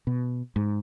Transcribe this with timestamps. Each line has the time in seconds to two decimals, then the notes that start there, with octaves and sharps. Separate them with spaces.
0.07 B2
0.56 G#2